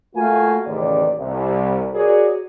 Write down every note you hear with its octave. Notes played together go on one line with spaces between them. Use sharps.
A3 A#3 F4 F#4 F5 G#5
A1 D#2 C#3 D5
C2
F#4 G#4 A#4 C#5 D5